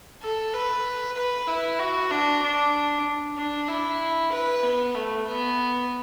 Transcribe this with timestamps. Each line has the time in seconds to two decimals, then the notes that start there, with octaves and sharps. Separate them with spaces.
0.22 A4
0.53 B4
1.16 B4
1.47 E4
1.79 F#4
2.11 D4
2.42 D4
3.37 D4
3.68 E4
4.32 B4
4.63 B3
4.95 A3
5.26 B3